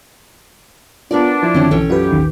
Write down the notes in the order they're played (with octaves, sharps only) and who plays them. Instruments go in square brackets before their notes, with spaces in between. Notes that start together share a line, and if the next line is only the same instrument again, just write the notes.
[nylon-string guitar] B3 A#4 D5 [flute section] D4 [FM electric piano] F4
[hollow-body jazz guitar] F3 E4
[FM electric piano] F#2 D3 D#3 [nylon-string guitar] C4 C#4
[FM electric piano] B1 E3 [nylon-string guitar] C#4 A4 G5
[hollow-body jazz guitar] F#2 [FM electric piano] F4 B4 [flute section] G4
[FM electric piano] A1 D#2 D#3